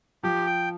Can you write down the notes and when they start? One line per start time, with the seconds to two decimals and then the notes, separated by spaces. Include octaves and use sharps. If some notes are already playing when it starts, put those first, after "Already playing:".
0.23 F3 G4
0.46 G5